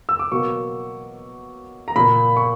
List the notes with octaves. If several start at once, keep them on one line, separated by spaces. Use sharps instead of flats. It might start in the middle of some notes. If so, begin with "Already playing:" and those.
E6
D6
B2 F#3 A#3 C#6
A#5
A#2 A#3 B5
C#6